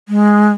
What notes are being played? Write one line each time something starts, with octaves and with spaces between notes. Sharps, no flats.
G#3